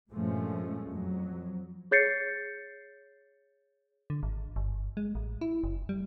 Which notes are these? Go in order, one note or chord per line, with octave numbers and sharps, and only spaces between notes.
G2 A#2 F3 G#3 A3 C#4
F2 F#3
G#4 C#5 G6 A6 C7 C#7
D3
G#1
G1
G#3
A1
E4
F#1
G3